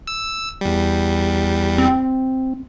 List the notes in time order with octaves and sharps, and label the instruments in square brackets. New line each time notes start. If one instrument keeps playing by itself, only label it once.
[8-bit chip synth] E6
E2 G3
[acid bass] C4